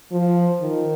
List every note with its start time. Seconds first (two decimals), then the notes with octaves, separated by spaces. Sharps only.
0.12 F3
0.62 D#3